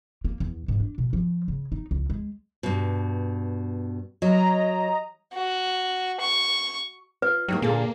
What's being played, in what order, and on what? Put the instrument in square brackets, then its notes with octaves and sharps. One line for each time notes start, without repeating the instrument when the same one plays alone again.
[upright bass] A#3
E2
G#2
D4
B2
F3
C#3
D#4
C#2
G#3
[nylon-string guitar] G2 B2
[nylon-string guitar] F#3 [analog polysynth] D#5 A#5
[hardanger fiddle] F#4
C#6
[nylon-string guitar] F4 [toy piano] B4
[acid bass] F#3 [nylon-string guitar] A#3 D#4 G4
[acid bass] A#2 [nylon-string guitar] D3 G#4 A4 [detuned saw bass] A#3